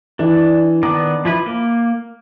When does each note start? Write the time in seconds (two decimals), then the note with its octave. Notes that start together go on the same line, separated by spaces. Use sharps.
0.19 E3 D4
0.83 D#3 B3 D4 D6
1.25 F3 E4 B4
1.46 A#3